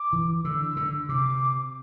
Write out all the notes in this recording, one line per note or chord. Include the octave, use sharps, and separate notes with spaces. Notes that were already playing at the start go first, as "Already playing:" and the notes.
Already playing: D6
E3
D3 E6
D3
C3 D6